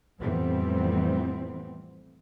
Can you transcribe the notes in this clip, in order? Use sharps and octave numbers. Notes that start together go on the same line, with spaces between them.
F2 A2 E3 G3 B3 C4